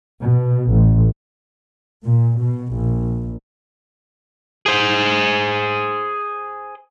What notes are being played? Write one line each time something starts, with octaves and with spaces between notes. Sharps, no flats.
B2
A1
A#2
B2
A#1
G#4 C5